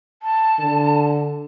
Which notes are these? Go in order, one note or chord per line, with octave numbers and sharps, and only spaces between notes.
A5
D3